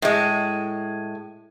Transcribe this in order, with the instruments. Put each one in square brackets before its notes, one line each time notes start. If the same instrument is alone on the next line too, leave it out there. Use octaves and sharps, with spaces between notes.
[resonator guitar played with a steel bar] A2 G#3